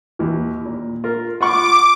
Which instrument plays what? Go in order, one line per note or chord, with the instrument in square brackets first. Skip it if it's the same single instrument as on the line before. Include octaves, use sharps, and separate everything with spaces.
[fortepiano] D#2 E3
A#2
F4 A#4
[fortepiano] F4 F#5 C#6 [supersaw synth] D6